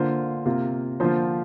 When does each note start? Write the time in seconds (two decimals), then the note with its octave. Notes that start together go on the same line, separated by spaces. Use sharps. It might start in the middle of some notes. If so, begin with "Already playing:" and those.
Already playing: D3 A#3 F4 C5
0.46 C3 A#3 F4
1.00 D3 F3 A#3 F4 C5